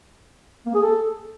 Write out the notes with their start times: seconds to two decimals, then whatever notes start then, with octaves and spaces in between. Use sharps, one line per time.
0.66 A#3
0.74 G#4
0.82 A4